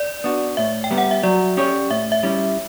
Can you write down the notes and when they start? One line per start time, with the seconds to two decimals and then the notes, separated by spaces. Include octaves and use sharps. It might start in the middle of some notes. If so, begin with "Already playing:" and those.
Already playing: D5
0.24 B3 D4 F#4
0.57 A2 E5
0.84 G5
0.91 G3 B3
0.98 F#5
1.11 E5
1.23 F#3 D5
1.57 C#4 G4 C#5
1.90 A2 E5
2.12 E5
2.23 G3 C#4 E4